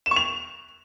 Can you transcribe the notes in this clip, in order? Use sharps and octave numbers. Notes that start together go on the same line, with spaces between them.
E7
C#6
F7